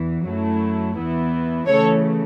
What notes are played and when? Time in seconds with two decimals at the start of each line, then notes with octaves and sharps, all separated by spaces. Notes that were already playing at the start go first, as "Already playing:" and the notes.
Already playing: E2 E3
0.24 F#2 F#3 A3 E4
0.96 E2 E3 B3 E4
1.67 C#3 E3 A3 A4 C#5